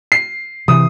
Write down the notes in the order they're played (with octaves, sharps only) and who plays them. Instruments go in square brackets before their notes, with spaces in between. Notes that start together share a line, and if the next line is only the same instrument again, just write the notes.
[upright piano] C7
[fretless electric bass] C3 E3 [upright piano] D#6